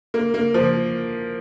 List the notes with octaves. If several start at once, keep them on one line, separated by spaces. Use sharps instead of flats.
A#3
A#3
F3